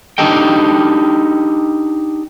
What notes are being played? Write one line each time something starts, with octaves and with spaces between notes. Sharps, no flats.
D4 D#4 G4 A4 D#5 G5